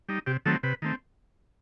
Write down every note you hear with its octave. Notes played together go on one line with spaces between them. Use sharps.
G3 D#4
C3 G4
D#3 F#3 A3 C4 A4
C3 B4
D#3 A3 C4